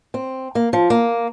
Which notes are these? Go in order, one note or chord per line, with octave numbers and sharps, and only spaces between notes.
C4
A#3
F3
A#3